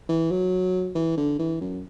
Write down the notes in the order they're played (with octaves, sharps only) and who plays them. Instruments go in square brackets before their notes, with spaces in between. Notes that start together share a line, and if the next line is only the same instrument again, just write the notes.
[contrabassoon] E3
F#3
E3
D3
E3
F#2